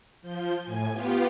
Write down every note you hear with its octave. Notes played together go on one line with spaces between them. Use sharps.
F3 G6
A2 G#5
B3 F4 G4